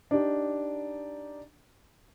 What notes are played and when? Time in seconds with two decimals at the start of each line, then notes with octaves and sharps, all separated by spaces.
0.11 D4 D#4 G4